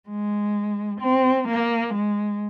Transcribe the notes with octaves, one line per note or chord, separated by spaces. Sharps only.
G#3
C4
A#3
G#3